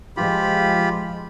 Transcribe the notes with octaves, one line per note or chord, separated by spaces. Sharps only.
F3 G#3 F4 G4 B5